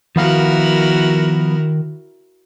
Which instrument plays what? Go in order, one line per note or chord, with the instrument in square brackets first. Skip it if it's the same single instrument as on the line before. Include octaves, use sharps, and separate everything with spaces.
[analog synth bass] D#3 [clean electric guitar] F3 B3 F5 [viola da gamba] E4 F#4 A#4